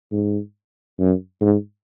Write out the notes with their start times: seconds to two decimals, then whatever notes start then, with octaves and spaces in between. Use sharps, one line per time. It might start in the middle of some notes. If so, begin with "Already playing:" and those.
0.12 G#2
0.99 F#2
1.41 G#2